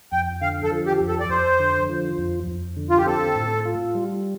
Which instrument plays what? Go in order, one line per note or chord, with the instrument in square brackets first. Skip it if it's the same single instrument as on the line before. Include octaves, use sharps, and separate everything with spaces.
[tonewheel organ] F2 [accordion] G5
[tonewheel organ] D3 [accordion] F5
[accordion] A4
[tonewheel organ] F3
[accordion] G4
[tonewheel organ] F2
[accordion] A4
D5
[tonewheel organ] F2 [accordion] C5
[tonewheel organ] D3
F3
F2
F2
D3
[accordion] F4
G4
[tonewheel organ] C4 [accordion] A4
[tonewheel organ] A2
F4
G3